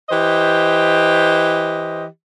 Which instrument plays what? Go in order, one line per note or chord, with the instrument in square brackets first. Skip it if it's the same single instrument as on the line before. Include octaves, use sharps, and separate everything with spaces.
[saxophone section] E3 G4 C5 D#5